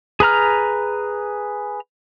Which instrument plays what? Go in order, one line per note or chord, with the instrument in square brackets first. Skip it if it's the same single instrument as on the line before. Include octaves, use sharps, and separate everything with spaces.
[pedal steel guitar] G#4 B4 A#5 F6